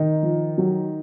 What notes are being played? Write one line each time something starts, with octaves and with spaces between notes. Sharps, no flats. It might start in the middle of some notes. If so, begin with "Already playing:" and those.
Already playing: D#3 D#4
F3
F#3